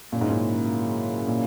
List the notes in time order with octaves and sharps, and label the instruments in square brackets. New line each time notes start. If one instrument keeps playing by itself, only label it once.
[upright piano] A#2 [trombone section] C#3 F#3 A#3 C#4 E4
[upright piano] G#2
A#2
A#2